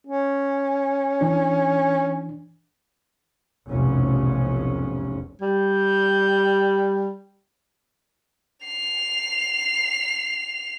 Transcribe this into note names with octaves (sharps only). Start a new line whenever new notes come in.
C#4
E3 D4
F1 B1 E2 G#2 C#4
G3 G6
C7 F7